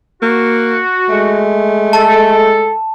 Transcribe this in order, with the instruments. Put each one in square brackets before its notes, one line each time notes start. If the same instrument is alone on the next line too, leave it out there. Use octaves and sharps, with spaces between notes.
[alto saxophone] A#3 [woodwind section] F#4
[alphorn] G#3 [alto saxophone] A3
[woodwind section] A4 [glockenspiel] A5